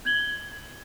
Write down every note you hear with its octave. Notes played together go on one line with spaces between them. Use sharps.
G6 G#6 F#7 G7